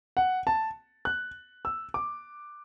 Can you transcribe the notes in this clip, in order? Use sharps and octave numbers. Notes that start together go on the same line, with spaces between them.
F#5
A5
F#6
E6
D6